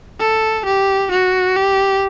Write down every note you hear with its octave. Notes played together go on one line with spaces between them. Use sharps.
A4
G4
F#4
G4